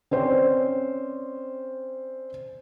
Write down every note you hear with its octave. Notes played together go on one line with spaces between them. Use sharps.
C4 C#4 C5 D5